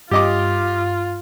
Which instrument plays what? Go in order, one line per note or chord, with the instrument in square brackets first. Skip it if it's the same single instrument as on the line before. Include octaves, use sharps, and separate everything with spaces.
[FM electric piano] G2 [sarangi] F4 [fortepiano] G4 D#5 D6